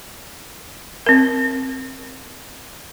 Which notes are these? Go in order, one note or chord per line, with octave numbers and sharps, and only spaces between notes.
C4 A#4